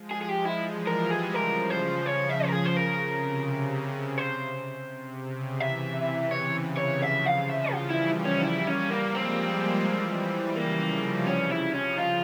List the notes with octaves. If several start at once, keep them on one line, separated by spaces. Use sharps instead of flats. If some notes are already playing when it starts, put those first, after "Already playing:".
Already playing: F3 G#3
G#4
G#4
F3 G#3 G4
E4
E3 G3
A#4
G#4
C#3 F3 A#4
C5
C#3 F3 C#5
E5
C#3
A#4
G#4
C5
C#3 A#4
C3
C5
C3
C#3
C3 E3 E5
C#3 C#5
C3 E3
C#5
C#3 F3 E5
F5
E5
E3 G3 F4
E4
C#4
G3 A#3 E4
C#4
A#3
F3 G#3 C4
E3 G3
C#3 F3 A#3
C3 E3
C#3 C#4
E4
C#3 F3
C#4
F4